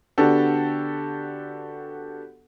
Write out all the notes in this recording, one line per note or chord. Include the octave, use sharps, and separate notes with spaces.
D3 B3 D4 F#4 G4 A4